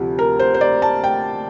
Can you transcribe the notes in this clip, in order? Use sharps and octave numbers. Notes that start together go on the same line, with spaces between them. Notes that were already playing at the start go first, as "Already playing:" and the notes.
Already playing: D2 C3 F3
A#4
C5
C5
D5
A5
G5